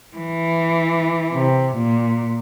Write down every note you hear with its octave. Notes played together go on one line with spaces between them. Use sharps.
E3
C3
A#2